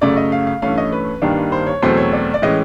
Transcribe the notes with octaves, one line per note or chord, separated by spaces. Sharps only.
F#2 C#3 F#3 A3 D5
D#5
F5
F5
G2 E3 A3 C#4 F5
D#5
B4
G2 D#3 G3 A#3 D4
C5
C#5
E2 B2 F#3 A3 C4 C5
C#5
D5
D5
A2 E3 G#3 C#4 D#5